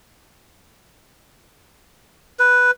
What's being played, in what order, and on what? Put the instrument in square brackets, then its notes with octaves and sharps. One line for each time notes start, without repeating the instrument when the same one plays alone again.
[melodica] B4